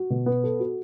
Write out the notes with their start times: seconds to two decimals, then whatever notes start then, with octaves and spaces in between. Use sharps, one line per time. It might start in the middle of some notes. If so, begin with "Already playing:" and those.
Already playing: F#4
0.10 B2
0.26 B3
0.44 A4
0.60 F#4